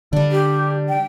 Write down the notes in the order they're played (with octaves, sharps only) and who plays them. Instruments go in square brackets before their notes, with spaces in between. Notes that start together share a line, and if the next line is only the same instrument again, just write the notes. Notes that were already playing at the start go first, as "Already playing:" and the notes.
[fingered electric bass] D3 [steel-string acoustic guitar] G3 D4
[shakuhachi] G4
G5